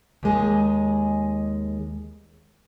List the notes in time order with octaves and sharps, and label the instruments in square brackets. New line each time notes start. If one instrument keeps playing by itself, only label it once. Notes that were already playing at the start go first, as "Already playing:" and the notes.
[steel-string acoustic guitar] D#2 G#3 G#4